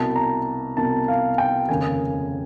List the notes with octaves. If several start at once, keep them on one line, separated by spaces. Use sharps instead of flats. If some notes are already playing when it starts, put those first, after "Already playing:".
Already playing: C2 B2 A5
A#5
C2 B2 A5
F5
G5
F1 D#2 C#3 G#5